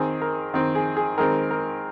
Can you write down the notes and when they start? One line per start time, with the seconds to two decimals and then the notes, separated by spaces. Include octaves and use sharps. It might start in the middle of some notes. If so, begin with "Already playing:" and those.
Already playing: D#3 C4 G#4
0.22 A#4
0.54 D#3 C4
0.75 G#4
0.97 G#4
1.18 D#3 G#3 C4 A#4
1.51 A#4